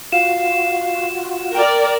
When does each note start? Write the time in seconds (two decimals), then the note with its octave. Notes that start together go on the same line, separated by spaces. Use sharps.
0.12 F4 F#4 F5 E7
1.55 A#4 D5 G5